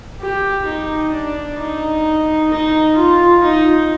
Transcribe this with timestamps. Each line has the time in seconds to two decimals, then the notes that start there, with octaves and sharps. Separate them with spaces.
0.20 G4
0.66 D#4
1.12 D4
1.58 D#4
2.51 D#4
2.96 F4
3.42 D#4